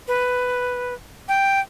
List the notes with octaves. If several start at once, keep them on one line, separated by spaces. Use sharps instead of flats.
B4
G5